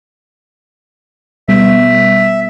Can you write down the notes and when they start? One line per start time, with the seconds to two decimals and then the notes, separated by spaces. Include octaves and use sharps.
1.48 B2 G3 B3 E5